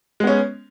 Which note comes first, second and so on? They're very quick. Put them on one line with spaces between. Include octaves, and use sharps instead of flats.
G#3 B3 C#4